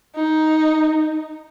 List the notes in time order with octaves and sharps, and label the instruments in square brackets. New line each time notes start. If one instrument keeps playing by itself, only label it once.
[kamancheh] D#4